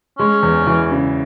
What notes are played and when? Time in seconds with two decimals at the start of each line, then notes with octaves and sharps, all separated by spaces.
0.18 G#3 C#4
0.42 E2
0.67 E3
0.91 C#3